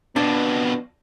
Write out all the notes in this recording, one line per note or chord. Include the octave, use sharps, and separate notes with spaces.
F2 B2 B3 D4